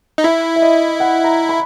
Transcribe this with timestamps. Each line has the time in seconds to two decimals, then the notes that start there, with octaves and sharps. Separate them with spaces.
0.18 D#4
0.24 E4 E5
0.56 E5
0.62 D#5
1.00 F#5
1.24 A#5
1.49 B5